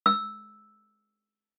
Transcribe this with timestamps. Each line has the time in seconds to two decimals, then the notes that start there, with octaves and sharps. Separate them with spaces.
0.06 E6